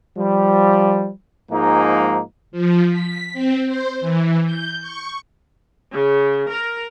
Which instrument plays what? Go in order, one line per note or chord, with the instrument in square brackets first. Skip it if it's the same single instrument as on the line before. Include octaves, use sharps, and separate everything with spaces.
[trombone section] F3 G3
G#2 F3 G#3 A#3 D#4
[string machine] F3
B6
C4
C5
E3
G6
C#6
[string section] C#3
A#4